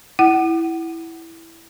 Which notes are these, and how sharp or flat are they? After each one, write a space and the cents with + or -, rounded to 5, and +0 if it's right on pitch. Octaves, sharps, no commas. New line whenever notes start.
E4 +0 F#5 +25